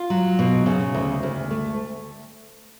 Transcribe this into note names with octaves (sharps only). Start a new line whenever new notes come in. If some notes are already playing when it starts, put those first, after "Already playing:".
Already playing: F4
F#3
B2
C#3
D2
D2
A3